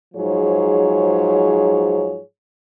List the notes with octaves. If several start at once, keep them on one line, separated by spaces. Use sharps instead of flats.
G#2 F3 F#3 G#4 C#5